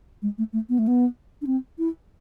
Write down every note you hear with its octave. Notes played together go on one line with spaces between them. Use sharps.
G#3
A3
A3
B3
A3
B3
D4
C4
E4